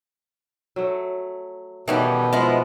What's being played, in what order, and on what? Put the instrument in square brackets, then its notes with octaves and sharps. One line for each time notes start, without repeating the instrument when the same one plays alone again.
[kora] F#3 A3
[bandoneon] B2 [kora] D#3 A3 B3 [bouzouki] E3 G3 C#4
[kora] F3 F4 [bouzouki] G#3 B3 E4